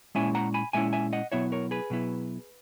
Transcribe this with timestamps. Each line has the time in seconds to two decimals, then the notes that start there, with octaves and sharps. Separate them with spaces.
0.15 A#2 G#3 C#4 E4 E5 G#5
0.35 F#5 A#5
0.54 G#5 B5
0.73 A#2 G#3 C#4 E4 E5 G#5
0.93 E5 G#5
1.13 D#5 F#5
1.32 B2 F#3 B3 E4 C#5 E5
1.52 A#4 C#5
1.71 G#4 B4
1.90 B2 F#3 B3 E4